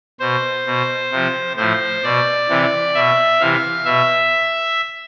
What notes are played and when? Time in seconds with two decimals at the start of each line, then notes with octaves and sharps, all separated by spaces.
0.20 B2 C5
0.66 B2
1.11 C3 F3
1.57 A2 F3 C5
2.03 B2 D5
2.49 C3 E3
2.94 B2 E5
3.40 C3 E3 F5
3.85 B2 E5